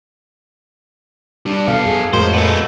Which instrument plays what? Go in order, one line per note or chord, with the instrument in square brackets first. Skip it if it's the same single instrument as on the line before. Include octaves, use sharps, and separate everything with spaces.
[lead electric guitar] G3 D4
[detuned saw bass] B2 [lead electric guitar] B3 A4 [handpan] F5
[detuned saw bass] F#2 [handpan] G#4
[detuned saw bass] F2 [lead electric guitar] A2 [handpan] G#3 F#4 A#4 [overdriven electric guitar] C5
[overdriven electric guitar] A3 B3